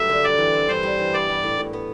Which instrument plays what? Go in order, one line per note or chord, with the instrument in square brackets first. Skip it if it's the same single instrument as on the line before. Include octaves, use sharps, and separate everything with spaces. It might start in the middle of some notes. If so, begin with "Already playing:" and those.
Already playing: [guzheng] G2 F#3 A3 [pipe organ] E5
[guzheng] D3
[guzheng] G3 [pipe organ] D5
[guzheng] E3
C4
[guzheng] G2 [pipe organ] C5
[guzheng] G3
E3
[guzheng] B3 [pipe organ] D5
[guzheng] G3
A2
A2
B3